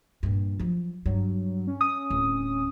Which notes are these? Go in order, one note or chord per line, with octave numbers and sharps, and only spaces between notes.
G2 A#2
F3 F#3
G2 F#3
C#4
D#6
D1